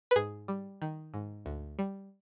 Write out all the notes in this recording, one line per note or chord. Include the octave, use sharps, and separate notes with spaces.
B4
G#2 G#4
G3
D#3
G#2
D2
G3